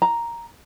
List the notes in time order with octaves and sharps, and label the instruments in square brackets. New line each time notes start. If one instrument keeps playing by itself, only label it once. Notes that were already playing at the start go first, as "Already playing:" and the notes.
[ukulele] A#5